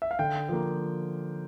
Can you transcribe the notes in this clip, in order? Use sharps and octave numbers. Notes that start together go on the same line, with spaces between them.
E5
F5
D3 G5
F3 A#3